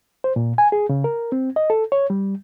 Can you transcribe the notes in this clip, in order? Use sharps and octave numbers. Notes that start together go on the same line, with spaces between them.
C5
A#2
G#5
G#4
C#3
A#4
C4
D#5
A4
C#5
G3